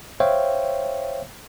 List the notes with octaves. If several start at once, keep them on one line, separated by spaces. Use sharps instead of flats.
C5 C#5 E5 F5 G5